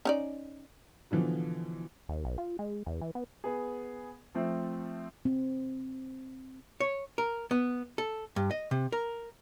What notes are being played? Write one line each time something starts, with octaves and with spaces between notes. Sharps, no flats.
C#4 D#4 D5
B2 D3 E3 F3
D#2
B1
F4
G#3
E2
E3
B3
B3 G#4
F3 A3 C4
C4
C#5
A#4
B3
A4
G2
D#5
C3
A#4